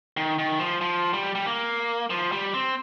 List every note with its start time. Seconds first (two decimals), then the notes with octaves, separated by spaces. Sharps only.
0.17 D#3
0.39 D#3
0.59 F3
0.81 F3
1.14 G3
1.35 G3
1.46 A#3
2.10 F3
2.32 G3
2.54 C4